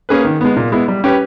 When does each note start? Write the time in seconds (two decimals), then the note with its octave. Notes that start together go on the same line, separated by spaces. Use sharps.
0.09 A#3 C#4 G#4 B4
0.25 D#3
0.41 G#3 B3
0.56 A#2
0.72 G#3 B3 E4
0.88 G3
1.04 C#4 G4 B4